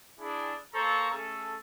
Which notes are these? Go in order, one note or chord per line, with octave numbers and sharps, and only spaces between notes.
D4 E4 G#4
A#3 A4 C5 A#5 C#6
A3 C#4 G#4 A4